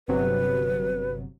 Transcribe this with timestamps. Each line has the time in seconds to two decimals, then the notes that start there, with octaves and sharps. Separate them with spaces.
0.08 G1 C3 F#3 B4